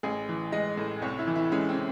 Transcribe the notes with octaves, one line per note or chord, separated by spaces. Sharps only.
A1 G#4
E3
G#3 D#5
A2
C2 C#5
E4
E3
E4
G#3 C#4
C4
C3